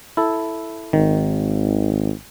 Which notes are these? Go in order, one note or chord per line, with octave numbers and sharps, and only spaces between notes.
E4 A4
G#1 D#3